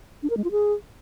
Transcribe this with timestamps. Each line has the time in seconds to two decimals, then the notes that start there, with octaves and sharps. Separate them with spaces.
0.23 D4
0.30 A#4
0.37 G#3
0.44 F4
0.51 G#4